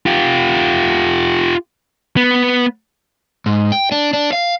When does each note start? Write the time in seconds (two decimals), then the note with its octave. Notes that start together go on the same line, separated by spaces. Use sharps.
0.06 F4 G4
2.17 B3
3.46 G#2
3.72 G5
3.92 D4
4.13 D4
4.33 F5